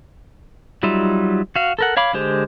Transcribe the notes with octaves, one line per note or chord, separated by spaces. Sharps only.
F#3 G3 D#4 F4 E5
F#4 F5
A4 A#4 F#5
C#5 F5 B5 D6
D3 G#3 G4 C5